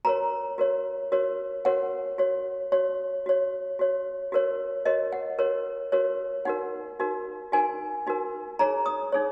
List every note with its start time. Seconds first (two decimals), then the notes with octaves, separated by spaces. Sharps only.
0.05 F#4 A#4 C#5 A#5
0.58 F#4 A#4 C#5
1.12 F#4 A#4 C#5
1.65 F#4 A#4 C#5 F#5
2.18 F#4 C#5
2.72 F#4 C#5
3.26 F#4 C#5
3.79 F#4 C#5
4.32 F#4 A#4 C#5
4.85 F#4 A#4 C#5 D#5
5.13 F#5
5.39 F#4 A#4 C#5
5.92 F#4 A#4 C#5
6.45 D#4 F#4 A#4 F#5
7.00 D#4 F#4 A#4
7.52 D#4 F#4 A#4 G#5
8.07 D#4 F#4 A#4
8.59 D#4 G#4 C#5 A#5
8.86 D#6
9.12 D#4 G#4 C#5